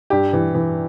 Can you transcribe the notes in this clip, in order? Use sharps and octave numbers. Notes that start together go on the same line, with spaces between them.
G2 G4
E3
E3